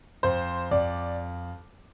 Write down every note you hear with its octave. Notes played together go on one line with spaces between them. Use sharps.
F2 C5
F2 D5